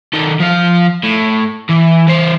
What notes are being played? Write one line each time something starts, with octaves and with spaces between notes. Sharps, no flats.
D#3 A4
F3 F5
A2
E3
E3 C5